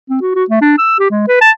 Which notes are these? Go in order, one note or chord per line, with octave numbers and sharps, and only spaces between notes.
C4
F#4
F#4
A3
D4
E6
G4
G#3
B4
A5